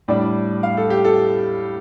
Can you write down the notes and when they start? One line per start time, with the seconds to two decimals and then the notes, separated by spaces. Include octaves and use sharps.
0.08 A2 G3 D4 D5
0.63 F5
0.77 A4
0.90 G4
1.05 A4